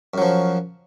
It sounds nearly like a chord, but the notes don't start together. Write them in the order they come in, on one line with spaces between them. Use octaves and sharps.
F#2 F#3 F3